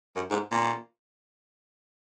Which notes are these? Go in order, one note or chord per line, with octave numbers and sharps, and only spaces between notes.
F#2
G#2
A#2